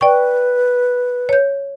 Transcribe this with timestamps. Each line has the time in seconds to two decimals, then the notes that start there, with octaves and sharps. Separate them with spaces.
0.01 B4 D5 G5 C#6
1.29 C#5 G6